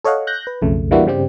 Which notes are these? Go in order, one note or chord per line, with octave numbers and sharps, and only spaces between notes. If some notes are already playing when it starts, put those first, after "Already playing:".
A4 C#5 D#5 F5 F#5
F#6 G6 A#6
B4
B1 F2 C#3 A3
E3 G3 A#3 D4 E4 F#4
G2 C#3 G3 C4 G4